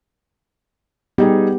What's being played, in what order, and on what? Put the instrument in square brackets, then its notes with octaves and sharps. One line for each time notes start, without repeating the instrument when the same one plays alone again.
[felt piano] G3 D#4 G#4 [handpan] B3 G4